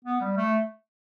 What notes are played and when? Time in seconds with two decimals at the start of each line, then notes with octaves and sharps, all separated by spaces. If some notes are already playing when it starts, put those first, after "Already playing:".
0.04 B3
0.21 G3
0.37 A3